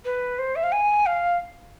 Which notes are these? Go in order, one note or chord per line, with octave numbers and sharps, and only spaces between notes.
B4
C5
E5
F5
G#5
F5